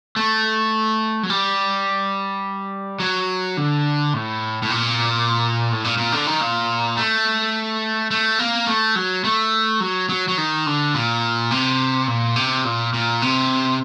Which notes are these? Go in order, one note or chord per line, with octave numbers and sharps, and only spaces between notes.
A3
F#3
G3
F#3
D3
A2
A2
A#2
A2
A#2
A#2
D3
D#3
A#2
A3
A3
A#3
A3
F#3
A3
F#3
F#3
F#3
D#3
D3
A#2
C3
A#2
C3
A#2
A#2
C3